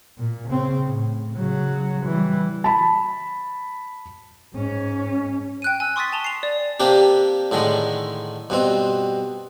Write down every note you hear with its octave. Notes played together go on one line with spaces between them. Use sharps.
A#2
C#3 C4
A2
C#3 F#3
E3 G3
A5 B5
G#2 C#4
G5 F#6 D#7
G#5 E6
C6 C#6 D#6 F#6 A6 B6
G#5 A5 F7 G7
C7 F7
D5
C3 A#3 D4 G4
A2 D3 D#3 G#3
G2 B2 C4